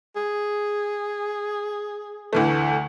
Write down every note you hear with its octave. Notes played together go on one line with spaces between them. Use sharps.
G#4
D2 E3 A3